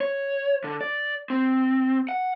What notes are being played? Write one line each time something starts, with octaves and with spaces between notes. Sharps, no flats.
C#5
D3
D5
C4
F#5